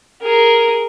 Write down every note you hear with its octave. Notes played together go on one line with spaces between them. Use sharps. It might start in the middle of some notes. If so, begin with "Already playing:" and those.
G#4 A#4